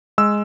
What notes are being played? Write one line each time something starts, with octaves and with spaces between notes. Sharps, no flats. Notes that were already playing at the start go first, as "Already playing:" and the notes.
G#3 E6